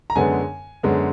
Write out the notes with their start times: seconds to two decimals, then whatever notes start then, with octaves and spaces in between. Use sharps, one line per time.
0.10 A#5
0.15 F#2 D3 G#3 B3 G#5
0.83 F#2 D3 G#3 B3